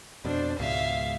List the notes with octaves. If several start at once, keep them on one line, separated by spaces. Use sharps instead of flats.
F2 B2 D4 C5
C#2 G#2 B2 E5 F5